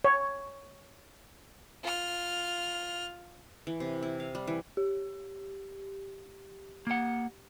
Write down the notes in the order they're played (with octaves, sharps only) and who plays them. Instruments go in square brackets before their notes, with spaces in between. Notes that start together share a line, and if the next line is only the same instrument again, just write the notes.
[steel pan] C#5
[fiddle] F4 F6
[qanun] E3
C3
E4
F5
G3
E3
[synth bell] G4
[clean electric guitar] A#3 F#5